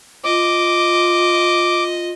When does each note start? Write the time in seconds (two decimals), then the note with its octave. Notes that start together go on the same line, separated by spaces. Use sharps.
0.25 F4 D#5 D6